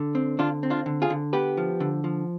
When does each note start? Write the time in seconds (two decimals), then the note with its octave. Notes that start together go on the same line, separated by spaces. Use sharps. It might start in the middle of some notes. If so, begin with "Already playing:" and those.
Already playing: D3
0.15 C4
0.39 D3 D4 F4
0.63 C4
0.70 D4 F4
0.86 D3
1.02 F4 G#4
1.10 D3
1.33 B3 G4 B4
1.57 F3
1.80 D3
2.04 F3